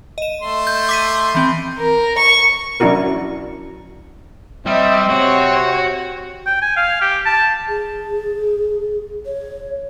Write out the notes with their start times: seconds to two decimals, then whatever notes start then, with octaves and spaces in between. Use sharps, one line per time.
0.18 D#5 E7
0.41 A3 C6
0.67 G6
0.89 D6 B6 D#7
1.35 E3 C4 G5
1.78 A#4
2.18 C#6
2.80 F#3 C#4 D4 E4 F#4 A#4
4.66 G3 C4 D#5 E5
5.10 C3 F#4 C#5 G5
6.46 G5
6.61 G#5
6.77 F5
7.01 G4
7.26 A5
7.69 G#4
9.26 C#5